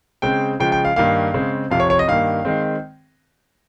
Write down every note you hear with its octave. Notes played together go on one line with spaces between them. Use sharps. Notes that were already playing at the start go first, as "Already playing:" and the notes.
C#3 G#3 C4 G5
C#3 F3 G#3 G5
G5
F5
G2 D#3 A#3 F5
C#3 G#3 C4
F2 C3 F3 F5
C#5
C#5
D#5
G2 D#3 A#3 F5
D#3 G#3 C4